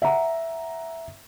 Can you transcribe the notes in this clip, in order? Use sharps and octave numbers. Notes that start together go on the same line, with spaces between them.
E5 F#5 A#5